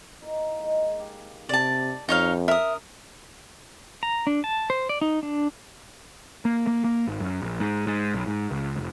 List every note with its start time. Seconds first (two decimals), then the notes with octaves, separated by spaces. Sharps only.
0.21 A#3 D#4 E4
0.60 D#3 G#3 D#4
1.00 G4 F5 G#5
1.49 C3 D5 A5
2.09 F2 C#4 D#4 F#4 C#5 F5
2.48 A#4 E5 D#6
4.03 A#5
4.27 D4
4.44 A5
4.70 C5
4.89 D5
5.01 D#4
5.23 D4
6.45 A#3
6.67 A#3
6.84 A#3
7.07 G#1
7.20 F#2
7.42 A#1
7.60 G#2
7.87 G#2
8.14 B1
8.27 G#2
8.51 C#2
8.77 F1